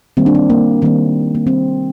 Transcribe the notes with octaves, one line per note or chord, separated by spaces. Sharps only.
D#3 G3 A#3 C4
D4
C4
A#3
D#3 G3 A#3 C4
A#3
D#3 G3 A#3 C4